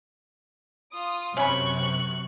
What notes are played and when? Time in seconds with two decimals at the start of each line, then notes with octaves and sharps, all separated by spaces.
0.94 F4 D#6
1.37 F#2 C3 C#4 B5 C#6 F#6